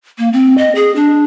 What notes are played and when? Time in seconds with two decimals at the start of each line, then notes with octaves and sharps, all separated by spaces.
0.18 A#3
0.33 C4
0.58 D#5
0.75 G#4
0.96 D4